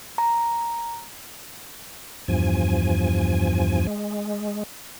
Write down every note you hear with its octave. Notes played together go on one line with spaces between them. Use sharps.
A#5
E2 G2 F3 G#5
G#3